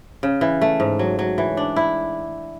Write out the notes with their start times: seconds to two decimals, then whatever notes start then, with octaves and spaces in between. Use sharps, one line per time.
0.23 C#3
0.41 E3
0.61 A3
0.80 G#2
0.99 F#3
1.19 F#3
1.38 E3
1.57 D4
1.76 E4